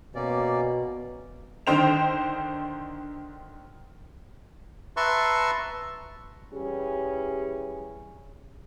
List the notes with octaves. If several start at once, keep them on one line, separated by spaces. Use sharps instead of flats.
B2 A#3 C#4 D5
D3 D#3 C5 G5 F7
B4 E5 A5 A#5 C6 C#6
E3 G3 C#4 G#4